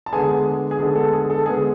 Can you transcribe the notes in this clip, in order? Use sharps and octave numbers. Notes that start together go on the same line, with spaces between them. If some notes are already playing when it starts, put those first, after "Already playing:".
A5
D3 G#3 B3 G#4 G#5
G#4
D3 G#3 B3 A4
A4
G#4
G#4
A4
D3 G#3 B3 G#4